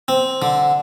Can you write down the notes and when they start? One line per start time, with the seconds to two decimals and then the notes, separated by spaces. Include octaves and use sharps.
0.08 C4
0.42 D3